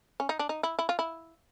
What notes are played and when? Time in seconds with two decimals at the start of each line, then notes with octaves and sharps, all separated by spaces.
0.20 C#4
0.29 D#4
0.39 D4
0.49 D#4
0.63 E4
0.79 E4
0.89 F4
0.99 E4